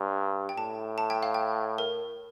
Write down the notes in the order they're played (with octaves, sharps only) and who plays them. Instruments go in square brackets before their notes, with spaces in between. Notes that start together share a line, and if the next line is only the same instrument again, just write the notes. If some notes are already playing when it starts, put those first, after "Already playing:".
Already playing: [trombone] G2
[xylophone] G5
[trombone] A2 [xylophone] A5
[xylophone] A5
G5
F5
G5
A#4